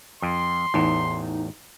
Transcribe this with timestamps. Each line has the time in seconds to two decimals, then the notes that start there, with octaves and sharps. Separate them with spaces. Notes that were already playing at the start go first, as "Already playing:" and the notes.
0.22 F2 C6
0.74 A1 E2 D#4